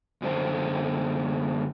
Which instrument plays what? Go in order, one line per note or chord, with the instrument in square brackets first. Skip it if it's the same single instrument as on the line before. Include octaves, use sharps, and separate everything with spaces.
[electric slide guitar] F#2 D3 C5